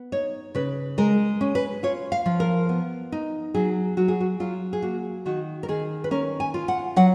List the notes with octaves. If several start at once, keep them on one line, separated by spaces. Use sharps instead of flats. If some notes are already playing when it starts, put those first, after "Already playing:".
Already playing: B3
D#4 C#5
C#3 B4
G#3 A#4
C#4
B4
F4 C#5
F5
F3
A#4
B3
D#4
F#3 G#4
F#3 F#4
G#4
F#4
F#3 F4
G#4
A#3 F#4
D#3 F#4
A#4
D#3 G#4
B4
C#4 A#4
G#5
F4
F#5
F#3 F#5